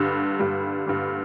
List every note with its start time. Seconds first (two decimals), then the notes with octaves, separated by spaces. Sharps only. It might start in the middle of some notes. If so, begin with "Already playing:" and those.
Already playing: G2 D3 G3
0.39 G2 D3 G3
0.87 G2 D3 G3